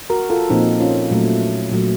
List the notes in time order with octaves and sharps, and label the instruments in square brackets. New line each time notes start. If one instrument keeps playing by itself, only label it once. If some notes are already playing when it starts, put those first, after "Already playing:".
[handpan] F#4 A#4
F4 A4
A#2 F3 A#3 C4 D#4
C#4 F4
A#2 F#3 A3
A#2 F#3 A3